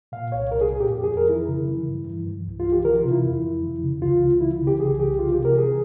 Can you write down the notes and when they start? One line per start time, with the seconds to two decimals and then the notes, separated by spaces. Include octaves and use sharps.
0.12 A#2 F5
0.32 C2 C#5
0.52 C2 A#4
0.61 G#4
0.72 A#2
0.80 G4
0.90 F2
1.04 G#4
1.10 F2
1.17 A#4
1.29 E3 E4
1.48 C#3
1.68 E3
1.88 G2
2.07 G2
2.27 E3
2.46 C2
2.60 F4
2.66 C2
2.72 G4
2.85 E3 A#4
2.98 F4
3.04 C3
3.11 E4
3.25 F2
3.44 F2
3.63 E3
3.83 C#3
4.02 C#2 F4
4.21 C#2
4.41 E3 E4
4.61 C#3
4.67 G4
4.80 C2 G#4
5.00 C2 G4
5.19 E3 F4
5.32 G4
5.38 C3
5.45 A#4
5.58 E3 G#4